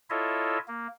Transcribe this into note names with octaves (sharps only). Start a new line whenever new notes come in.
E4 F4 A4 C#5 D#5 E5
A#3